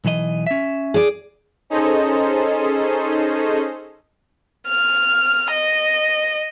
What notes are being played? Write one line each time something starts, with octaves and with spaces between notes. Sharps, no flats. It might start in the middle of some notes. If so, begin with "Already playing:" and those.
B1 E3 D#5
C#4 E5
G#4 D5
C#4 D#4 G#4 A4 C5 D#5
F6
D#5